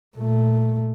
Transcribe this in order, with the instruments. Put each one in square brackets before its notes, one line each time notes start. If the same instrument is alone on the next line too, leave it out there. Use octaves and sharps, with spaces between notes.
[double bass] A#2 A3